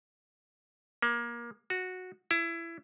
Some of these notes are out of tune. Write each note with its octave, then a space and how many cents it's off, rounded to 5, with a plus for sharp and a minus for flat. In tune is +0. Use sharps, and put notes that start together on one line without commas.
A#3 +25
F#4 -10
E4 +20